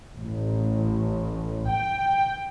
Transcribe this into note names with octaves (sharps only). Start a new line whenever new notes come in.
A1
G5